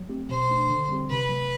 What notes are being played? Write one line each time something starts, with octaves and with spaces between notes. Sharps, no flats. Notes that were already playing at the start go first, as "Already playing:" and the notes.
Already playing: F#3
A3 C4 G4
B2 C5
A3 D4
D3
G3 C4 G4
C3 B4
F#3 A3